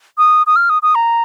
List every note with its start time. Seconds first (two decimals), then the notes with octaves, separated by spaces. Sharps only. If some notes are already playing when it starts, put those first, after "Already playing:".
0.18 D#6
0.47 D#6
0.56 F6
0.70 D#6
0.83 D#6
0.95 A#5